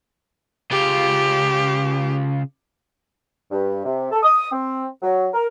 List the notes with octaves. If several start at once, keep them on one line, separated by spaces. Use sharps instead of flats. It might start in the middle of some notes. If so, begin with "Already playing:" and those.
C#3 F4 G4
G2
C3
A4
D#6
C4
F#3
A#4